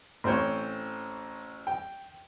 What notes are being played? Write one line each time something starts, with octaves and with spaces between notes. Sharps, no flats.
A1 C4 C5 C#5
G5